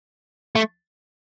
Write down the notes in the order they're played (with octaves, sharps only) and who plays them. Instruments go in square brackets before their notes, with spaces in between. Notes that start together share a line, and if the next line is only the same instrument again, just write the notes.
[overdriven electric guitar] A3